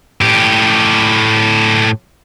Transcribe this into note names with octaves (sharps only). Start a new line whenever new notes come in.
A2 G4